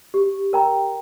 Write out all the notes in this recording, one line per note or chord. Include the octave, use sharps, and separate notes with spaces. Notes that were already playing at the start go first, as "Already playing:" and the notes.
G4
A#4 G5 A#5